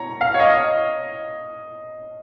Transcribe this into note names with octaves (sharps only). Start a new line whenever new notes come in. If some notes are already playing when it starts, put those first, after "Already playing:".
Already playing: C#5 A#5
F5
C#5
D#5